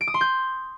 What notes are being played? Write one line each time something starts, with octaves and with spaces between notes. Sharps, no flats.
D7
D#6
C6
G6